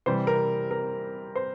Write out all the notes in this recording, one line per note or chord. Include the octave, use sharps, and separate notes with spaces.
C3 E3 G3 C5
A#4
A#4
C5